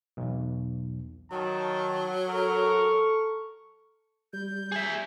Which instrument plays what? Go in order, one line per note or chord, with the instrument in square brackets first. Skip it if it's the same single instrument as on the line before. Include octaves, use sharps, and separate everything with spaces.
[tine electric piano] B1 E2
[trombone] D#3 [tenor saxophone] F#3 [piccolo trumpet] A5
[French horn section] A4 [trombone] A#4 [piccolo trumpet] C#6
[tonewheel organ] G3 [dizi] G6
[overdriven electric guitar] G#4 E5